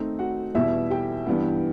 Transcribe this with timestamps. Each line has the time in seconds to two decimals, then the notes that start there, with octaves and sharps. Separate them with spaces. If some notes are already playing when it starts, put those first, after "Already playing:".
Already playing: D#3 A3 C4 D#4
0.19 F#4 F#5
0.55 E2 B2 G3 E4 E5
0.90 G4 G5
1.26 G2 E3 G3 B3